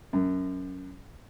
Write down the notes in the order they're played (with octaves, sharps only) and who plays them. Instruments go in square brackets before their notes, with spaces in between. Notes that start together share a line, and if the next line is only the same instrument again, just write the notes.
[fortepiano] F#2